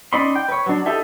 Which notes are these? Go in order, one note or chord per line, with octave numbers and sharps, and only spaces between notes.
C#4 D#4 D5 B5 C6
G5
B4 C#5
F#3 D4
D#4 E4 G4 A4 E5